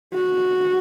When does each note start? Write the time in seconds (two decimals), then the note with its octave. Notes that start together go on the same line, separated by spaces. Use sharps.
0.13 F#4